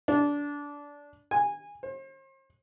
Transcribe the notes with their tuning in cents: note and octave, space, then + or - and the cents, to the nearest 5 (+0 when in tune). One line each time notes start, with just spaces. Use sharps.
D4 -20
G#5 -20
C5 +40